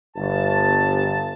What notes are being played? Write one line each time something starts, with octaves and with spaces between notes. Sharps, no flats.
G1 A5